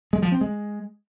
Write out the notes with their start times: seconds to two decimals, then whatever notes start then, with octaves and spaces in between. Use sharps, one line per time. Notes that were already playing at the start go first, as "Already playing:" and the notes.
0.13 G#3
0.22 F3
0.32 C4
0.41 G#3